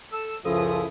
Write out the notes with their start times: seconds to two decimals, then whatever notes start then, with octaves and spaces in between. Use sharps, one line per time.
0.12 A4 E6
0.45 C#2 F#2 F3 E4 A4 D#6